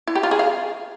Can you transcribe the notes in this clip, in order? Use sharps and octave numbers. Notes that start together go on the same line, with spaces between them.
E4
G4
F4
G#4
F5